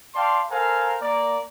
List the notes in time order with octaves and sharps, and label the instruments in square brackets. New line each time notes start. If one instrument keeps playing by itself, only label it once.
[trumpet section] D5 F5 G5 A5 C6
A4 A#4 C5 F5 G#5 A#5
A#3 D5 A#5